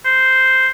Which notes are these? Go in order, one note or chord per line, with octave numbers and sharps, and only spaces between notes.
C5